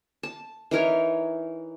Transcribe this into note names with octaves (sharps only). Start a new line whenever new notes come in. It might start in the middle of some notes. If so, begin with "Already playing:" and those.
A5
E3 D#4 A#4 C#5